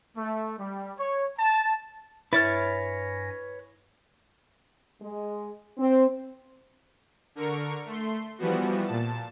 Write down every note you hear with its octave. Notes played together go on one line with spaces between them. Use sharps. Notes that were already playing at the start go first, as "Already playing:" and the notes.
A3
G3
C#5
A5
G2 E4 B4 C#5 G#5 F6 A6 A#6
G#3
C4
D3 A#4 C#6
A3 C6
E3 F3 G3 B3 F#4
A#2 A5